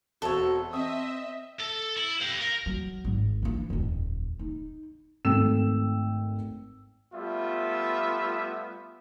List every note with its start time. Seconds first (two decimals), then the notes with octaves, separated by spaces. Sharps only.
0.22 E1 C4 F#4 A4 C#5 E5
0.73 C4 D#5 E5 D#6
1.59 A4
1.96 E4
2.21 G4 F5
2.40 A#4
2.66 F#3
3.04 G#1
3.42 E3 D4
3.70 D#1 F2
4.39 D#4
5.25 G#1 A3 G5 E6 E7
7.14 G3 A3 B3 F4 E5